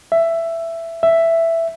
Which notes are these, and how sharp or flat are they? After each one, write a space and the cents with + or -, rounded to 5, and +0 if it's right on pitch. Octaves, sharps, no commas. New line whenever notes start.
E5 +10
E5 +5